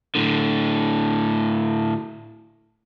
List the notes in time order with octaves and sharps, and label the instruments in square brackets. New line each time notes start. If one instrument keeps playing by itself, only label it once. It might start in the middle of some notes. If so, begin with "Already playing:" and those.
[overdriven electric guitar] A2 D3